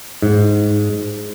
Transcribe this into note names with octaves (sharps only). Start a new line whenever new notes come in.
G#2